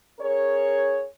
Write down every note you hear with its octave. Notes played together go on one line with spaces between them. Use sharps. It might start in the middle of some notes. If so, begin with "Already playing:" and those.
C#4 G#4 A#4 C#5